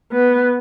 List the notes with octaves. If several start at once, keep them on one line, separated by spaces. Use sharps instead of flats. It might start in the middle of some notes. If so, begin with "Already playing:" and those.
B3